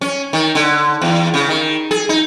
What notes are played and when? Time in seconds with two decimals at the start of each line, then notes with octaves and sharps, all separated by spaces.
0.01 C#4
0.33 D#3
0.55 D3
1.01 E2
1.34 C#3
1.49 D#3
1.91 G#4
2.09 D#4